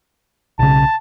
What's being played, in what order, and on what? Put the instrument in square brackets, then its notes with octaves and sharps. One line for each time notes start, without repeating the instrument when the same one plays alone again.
[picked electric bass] B1 C#3 [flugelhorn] A5